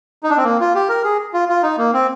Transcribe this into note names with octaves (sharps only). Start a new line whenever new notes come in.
D#4
D4
C4
A#3
F4
G4
A#4
G#4
F4
F4
D#4
A#3
C4